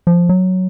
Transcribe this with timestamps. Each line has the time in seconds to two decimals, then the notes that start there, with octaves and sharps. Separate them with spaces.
0.07 F3
0.29 F#3